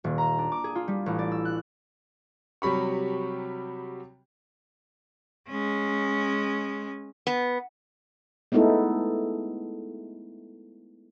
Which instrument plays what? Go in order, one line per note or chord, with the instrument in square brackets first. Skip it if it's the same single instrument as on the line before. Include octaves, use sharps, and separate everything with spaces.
[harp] D#1
A#5
D4
D6
G#4
F4
G3
A1
D5
E6
F#6
[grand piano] C3 F#3 G3 B5 C#6
[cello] G#3 C#4
[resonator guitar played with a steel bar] B3
[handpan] G#3 A3 B3 D#4 E4 A4